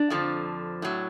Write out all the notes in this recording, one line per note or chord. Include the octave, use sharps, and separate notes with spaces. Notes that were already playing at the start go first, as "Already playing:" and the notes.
Already playing: D4
F2 D3 F3
A2 F#3